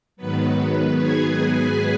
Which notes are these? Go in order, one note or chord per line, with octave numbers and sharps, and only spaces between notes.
G#2 D#3 F#3 B3 B4
G#4 G#5